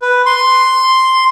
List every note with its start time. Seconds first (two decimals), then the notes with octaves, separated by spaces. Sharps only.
0.02 B4
0.26 C6